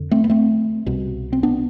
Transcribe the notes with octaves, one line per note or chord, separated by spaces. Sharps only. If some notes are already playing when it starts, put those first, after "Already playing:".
Already playing: F2 D3
A3 C4
B3
A3 C4
C2 B2
C4
B3 D4